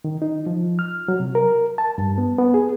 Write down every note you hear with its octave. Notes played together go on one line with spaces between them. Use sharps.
D#3
D#4
F3
F6
F#3
C3
A#4
A5
G2
B3
B3
G#4